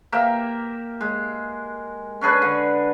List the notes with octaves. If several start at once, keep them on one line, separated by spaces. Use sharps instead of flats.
A#3 G4 A#4 E5
G#3
C#4 D4 G#4 B4
D3